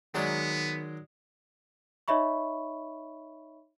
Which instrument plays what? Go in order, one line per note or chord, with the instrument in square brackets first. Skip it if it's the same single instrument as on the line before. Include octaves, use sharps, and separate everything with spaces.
[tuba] D#3 [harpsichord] F#3 A#5 C#6 [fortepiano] G#3 D5 [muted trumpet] B3
[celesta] D#4 C#5 D#5 E5 B5 C#6